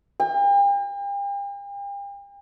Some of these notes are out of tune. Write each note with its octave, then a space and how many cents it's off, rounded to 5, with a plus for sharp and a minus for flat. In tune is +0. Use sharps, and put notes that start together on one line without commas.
G5 +40